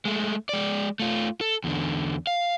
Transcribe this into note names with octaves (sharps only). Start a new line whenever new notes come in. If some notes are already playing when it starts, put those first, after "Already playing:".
G#3 A3
G#3 D5
A3 F4
A4
E2 D3
F5